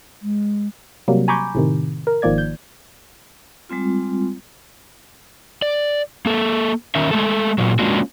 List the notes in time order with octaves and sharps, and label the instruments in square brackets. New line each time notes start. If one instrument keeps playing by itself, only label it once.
[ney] G#3
[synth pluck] C3 F#3 G3 A#3
G#5 A#5 B5 C#6 D6 G6
A2 C3 D#3
A#4
G#1 D#3 F3 A#3 D5 G#6
G6
[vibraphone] G3 G#3 C4 F4
[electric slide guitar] D5
A#3 A4
D#3 C#4 A#4 E5
G#3 A3 A4
A#2 F#3
G#3 A#3 C#4 D4 F4 F#4